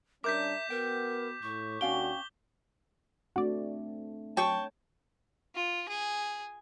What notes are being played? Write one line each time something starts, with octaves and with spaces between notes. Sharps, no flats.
G3 C#4 D4 A#4 E5 D6 G6 B6
B3 F#4 A#4 G5
A2 C#6
D#2 C#4 D4 F#4 F5 G5 G7
A3 C4 D4 F#4 D5
F#3 C#5 G5 A5 C#6
F4
G#4